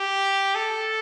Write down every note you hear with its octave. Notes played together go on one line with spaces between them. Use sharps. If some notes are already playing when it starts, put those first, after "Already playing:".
Already playing: G4
A4